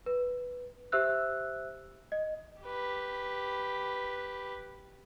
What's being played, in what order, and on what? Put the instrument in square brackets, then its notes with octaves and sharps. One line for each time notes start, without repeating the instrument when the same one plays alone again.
[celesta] B4
G4 C5 E5 E6 F#6
D#5
[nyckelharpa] G4 B4